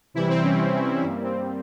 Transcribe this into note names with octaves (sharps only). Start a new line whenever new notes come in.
C3 E3 G3 E4
C4
C#4
C#4
G2 G3 A#3 C4
C4